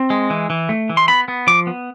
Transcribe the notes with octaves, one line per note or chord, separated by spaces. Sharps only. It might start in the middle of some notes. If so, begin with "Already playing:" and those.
Already playing: C4
G#3
E3
E3
A3
E3
C6
B3 B5
B3
F3 D6
B3